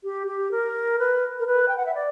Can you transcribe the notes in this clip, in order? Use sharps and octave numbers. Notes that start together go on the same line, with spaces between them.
G4
G4
A#4
B4
A#4
B4
G5
F#5
E5
D5